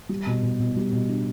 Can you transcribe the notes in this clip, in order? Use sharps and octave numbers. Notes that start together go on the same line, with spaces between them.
G3
B2
B2
B2
G3
B2
D4